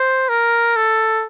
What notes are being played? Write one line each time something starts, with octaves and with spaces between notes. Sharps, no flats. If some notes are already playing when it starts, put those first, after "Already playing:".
Already playing: C5
A#4
A4